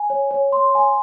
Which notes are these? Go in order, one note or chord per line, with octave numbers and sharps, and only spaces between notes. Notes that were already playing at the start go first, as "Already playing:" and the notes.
Already playing: G#5
C#5
C#5
C6
G#5